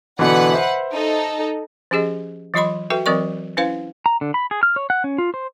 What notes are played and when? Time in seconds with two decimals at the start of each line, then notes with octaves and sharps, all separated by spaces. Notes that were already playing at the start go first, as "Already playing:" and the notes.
0.19 B2 D3 E3 B4 F#5
0.52 C5 E5
0.92 D#4 A4
1.91 F3 C#4 G4 G#4 D#5
2.54 E3 F#3 F4 D#5 B5 C6
2.90 F#4 A4 B4 E5 G5
3.06 E3 F#3 C4 A#4 D5 C#6
3.57 C#4 E4 B4 C5 F5
4.06 A#5
4.21 D3
4.34 B5
4.51 G#4
4.63 F6
4.76 C#5
4.90 F#5
5.04 C#4
5.18 F4
5.34 C5